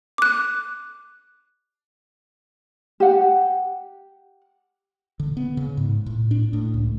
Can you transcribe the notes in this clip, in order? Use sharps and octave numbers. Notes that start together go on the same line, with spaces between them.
D6 F#6
G4 F#5
D3
B3
C#3
G#2
A2
D4
A2
C#2